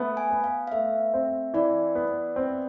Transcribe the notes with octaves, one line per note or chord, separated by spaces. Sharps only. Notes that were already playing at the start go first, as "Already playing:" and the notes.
Already playing: A3 B3
G#5
B3
F5
F5
A3 E5
C4
E3 D5
B3
C4